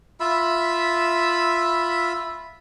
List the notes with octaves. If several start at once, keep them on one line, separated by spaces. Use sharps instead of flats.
F4 E5 B5 E6